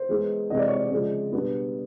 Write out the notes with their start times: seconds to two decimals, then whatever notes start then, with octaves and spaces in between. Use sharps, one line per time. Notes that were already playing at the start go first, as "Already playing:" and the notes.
Already playing: C5
0.09 E3 G#3 B3 D#4
0.50 C3 E3 G#3 C4 D#5
0.59 D5
0.68 C#5
0.77 D5
0.91 C#3 F3 G#3
1.32 B2 G3 B3 D4